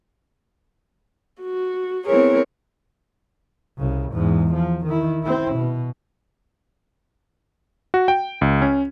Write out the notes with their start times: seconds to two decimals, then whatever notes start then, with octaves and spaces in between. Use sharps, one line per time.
1.42 F#4
2.05 B3 C4 E4 G#4 A#4 C#5
3.78 C2 C#3
4.12 E2 G#2
4.54 F3
4.85 D#3 E4
5.23 C4 E4
5.54 B2
7.94 F#4
8.08 G5
8.41 C#2
8.62 C#4